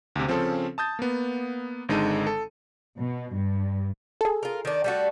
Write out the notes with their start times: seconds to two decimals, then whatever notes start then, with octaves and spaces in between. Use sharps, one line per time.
0.16 D2 C3
0.28 C#3 F3 C4 C#4 A4
0.78 A5 D#6 G6 A6
0.99 A#3 B3
1.89 G#1 D3 G#3 D#4 A4 D#7
2.27 A4
2.98 B2
3.33 G2
4.21 G#4 A4
4.43 F4 A#4
4.65 D#3 D4
4.84 G3 A3 F#4